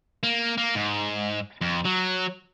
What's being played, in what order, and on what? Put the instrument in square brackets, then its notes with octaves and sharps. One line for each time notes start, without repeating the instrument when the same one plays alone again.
[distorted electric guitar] A#3
A#3
G#2
F2
F#3